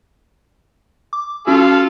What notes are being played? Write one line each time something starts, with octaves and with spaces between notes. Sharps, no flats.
D6
C#4 F4 F#4 A4 F5